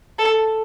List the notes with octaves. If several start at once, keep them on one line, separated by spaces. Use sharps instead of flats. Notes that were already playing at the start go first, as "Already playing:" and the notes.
A4